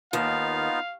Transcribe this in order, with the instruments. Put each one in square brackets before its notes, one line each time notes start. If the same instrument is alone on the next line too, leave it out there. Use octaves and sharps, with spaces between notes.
[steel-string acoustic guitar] D#2 [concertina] B3 D#4 F4 [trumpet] F5